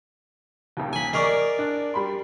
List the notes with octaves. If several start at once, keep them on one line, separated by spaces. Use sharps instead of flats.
D#1 D#2
G#5 B5
G#4 A#4 D5 D#5 C#6 D6
D4
G3 B5 C6